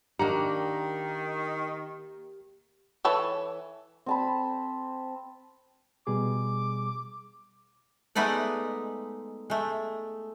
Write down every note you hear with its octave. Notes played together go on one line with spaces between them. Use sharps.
D#3 A#3 D4 G4 F#5 A#5
E3 A4 C#5 A5 B5
C4 A5 B5
B2 G3 G#4 D6
G#3 A3 B3 D#4 B4 D5
G#3 A3